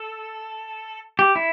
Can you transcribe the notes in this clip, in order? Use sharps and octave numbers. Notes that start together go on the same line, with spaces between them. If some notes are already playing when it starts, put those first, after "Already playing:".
Already playing: A4
G4
E4